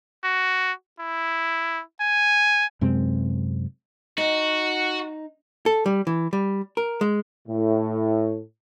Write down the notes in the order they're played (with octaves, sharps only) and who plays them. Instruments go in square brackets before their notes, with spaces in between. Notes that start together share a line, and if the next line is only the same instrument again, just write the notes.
[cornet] F#4
E4
G#5
[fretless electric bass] F#2 C3 G#3 C4
[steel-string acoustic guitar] D#4 [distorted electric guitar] F#4
[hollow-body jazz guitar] A4
G3
E3
G3
A#4
G#3
[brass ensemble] A2